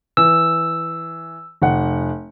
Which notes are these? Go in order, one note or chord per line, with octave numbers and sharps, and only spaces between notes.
E3 E6
F1 F#5